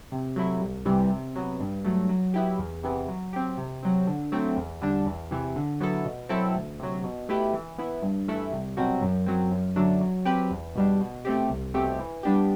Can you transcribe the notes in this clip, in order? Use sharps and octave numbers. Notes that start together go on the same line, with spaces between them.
C3
F#3 A3 E4
C2
C3 E3 G3
C3
F#3 B3
G2
F#3 A3
F#3
B3 E4 G4
E2
C3 E3 B3
F#3
C4 G4
C3
F#3 C4
D3
F#3 A3 C4
E2
D3 G3 D4
E2
C3 E3
D3
F#3 B3 E4 A4
B2
F#3 C4 E4 A4
D2
C3 F#3
B2
A3 E4 G4 B4
E3
B3 E4
G2
E3 A3 E4 A4
C2
B2 F#3 C4 F#4
F#2
F#3 C4
F#2
D3 F#3 A3 D4
F#3
C4 G4 B4
E2
B2 G3 D4
B2
A3 C4 G4
C2
B2 A3 C4 G4
E3
G3 B3 D4 G4